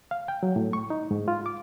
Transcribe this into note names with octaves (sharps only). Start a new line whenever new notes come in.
F5
G5
F#3
A2
C#6
D#4
G#2
F4
D6